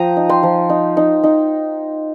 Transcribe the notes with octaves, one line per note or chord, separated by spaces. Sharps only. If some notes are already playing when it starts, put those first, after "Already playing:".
Already playing: F3 G5 A#5 D#6
D#4
G5 C6
F3
D#4
D#4
D#4